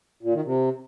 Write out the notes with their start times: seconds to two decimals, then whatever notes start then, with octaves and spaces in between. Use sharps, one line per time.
0.23 A#2
0.34 D#3
0.44 C3